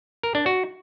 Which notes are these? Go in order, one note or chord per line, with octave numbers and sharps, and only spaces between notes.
A#4
D4
F#4